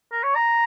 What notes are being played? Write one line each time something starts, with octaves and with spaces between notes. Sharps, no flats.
A#4
C#5
A#5